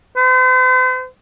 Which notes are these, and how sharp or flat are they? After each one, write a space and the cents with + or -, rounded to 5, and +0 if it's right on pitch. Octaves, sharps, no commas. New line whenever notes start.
C5 -45